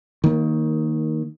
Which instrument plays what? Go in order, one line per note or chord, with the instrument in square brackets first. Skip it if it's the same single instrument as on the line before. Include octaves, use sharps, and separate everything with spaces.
[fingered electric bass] D#3 A#3